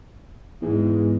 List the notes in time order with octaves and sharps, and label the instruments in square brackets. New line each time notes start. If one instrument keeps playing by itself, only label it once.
[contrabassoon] E2 [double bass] G#2